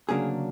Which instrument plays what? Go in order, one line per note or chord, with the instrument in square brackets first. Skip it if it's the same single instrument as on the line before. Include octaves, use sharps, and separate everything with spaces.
[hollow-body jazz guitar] D2 C#3 F#3 A#3 D4 G#4